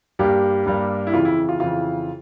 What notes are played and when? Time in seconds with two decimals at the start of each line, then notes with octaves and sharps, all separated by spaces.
0.19 G2 G3 A#3 G4
0.66 G2 G3 A#3
1.07 E4
1.13 F2 C#3 E3 F4
1.25 E4
1.49 F4
1.60 F2 C#3 E3 F4